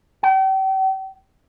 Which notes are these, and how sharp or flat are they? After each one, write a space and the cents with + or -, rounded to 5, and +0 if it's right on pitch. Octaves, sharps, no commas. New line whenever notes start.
G5 -40